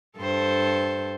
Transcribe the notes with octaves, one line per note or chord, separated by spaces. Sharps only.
G2 A4 C5